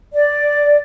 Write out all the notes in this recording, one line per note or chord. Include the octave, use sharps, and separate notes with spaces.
D5